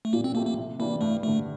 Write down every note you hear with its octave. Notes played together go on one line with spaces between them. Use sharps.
A3
A#2 A#3
C4
F3 A3 A#3 E4 G4
A#3
C3
E3 G3 A#3 D4
G2 A3
D3 G3 A3